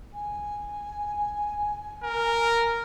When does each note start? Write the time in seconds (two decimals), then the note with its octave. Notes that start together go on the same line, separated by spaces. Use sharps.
0.13 G#5
2.03 A#4